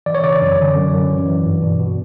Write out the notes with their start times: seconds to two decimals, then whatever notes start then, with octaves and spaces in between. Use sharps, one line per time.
0.06 E3 D5
0.15 C#5
0.23 C#3 D5
0.41 F#2
0.59 D3
0.75 F#2
0.93 F#2
1.10 E3
1.28 E3
1.44 G2
1.62 B2
1.79 B2